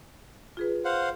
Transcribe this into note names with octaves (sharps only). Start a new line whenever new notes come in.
F4 G#4 B4
C5 F5 F#5